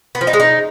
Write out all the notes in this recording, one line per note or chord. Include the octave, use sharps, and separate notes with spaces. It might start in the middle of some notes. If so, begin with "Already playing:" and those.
B3
F3
D#4
G#3
D#4